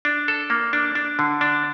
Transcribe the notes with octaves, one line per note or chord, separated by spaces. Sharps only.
D4
A4
A#3
D4
D4
D3
D4